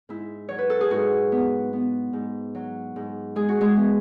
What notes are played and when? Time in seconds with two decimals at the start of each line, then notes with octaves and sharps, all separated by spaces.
0.09 G#2 E4
0.49 F#3 C#5
0.58 B4
0.70 A4
0.81 G#4
0.90 G#2 F#4
1.32 B3
1.73 B3
2.13 G#2
2.55 F#3
2.96 G#2
3.36 G#3 G#4
3.49 F#4
3.61 G#3 G#4
3.77 B3